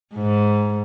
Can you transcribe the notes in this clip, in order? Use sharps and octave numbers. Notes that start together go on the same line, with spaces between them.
G#2